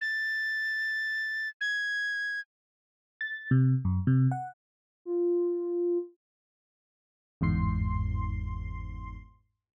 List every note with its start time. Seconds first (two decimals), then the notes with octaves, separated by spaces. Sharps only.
0.01 A6
1.61 G#6
3.21 A6
3.51 C3
3.85 F#2
4.07 C3
4.31 F#5
5.05 F4
7.41 G1 E2 G#2 C6 C7